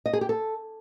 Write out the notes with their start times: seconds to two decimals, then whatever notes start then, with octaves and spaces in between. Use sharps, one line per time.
0.06 D#5
0.13 G#4
0.21 G4
0.29 A4